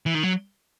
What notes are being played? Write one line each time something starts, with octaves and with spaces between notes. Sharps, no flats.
E3
D#3
F#3